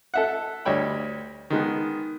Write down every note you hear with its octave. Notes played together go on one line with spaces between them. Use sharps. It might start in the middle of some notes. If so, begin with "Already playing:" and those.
A4 E5 F#5
D2 G3 C#5 G5 B5
D#3 G#3 B3